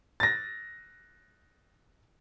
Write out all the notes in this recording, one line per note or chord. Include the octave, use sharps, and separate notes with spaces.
A6 A#6